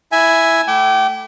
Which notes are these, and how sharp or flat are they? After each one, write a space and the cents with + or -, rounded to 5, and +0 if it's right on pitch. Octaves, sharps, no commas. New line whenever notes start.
E4 +0 E5 +0 G#5 +0
A3 +0 G5 -35 D6 +0